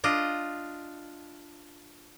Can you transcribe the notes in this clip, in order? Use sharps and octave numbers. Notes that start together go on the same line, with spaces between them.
D4 F4 D#5